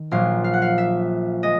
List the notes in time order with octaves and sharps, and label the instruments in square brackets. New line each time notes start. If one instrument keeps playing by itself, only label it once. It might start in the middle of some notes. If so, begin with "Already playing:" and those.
Already playing: [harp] D#3
A#1 A#2 F#3 F5
F5
F#5
F5
E5
G#3 D#5